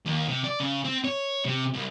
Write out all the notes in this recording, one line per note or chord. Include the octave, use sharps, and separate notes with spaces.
D#2
C3
D5
C#3
C4
C#5
C3
C2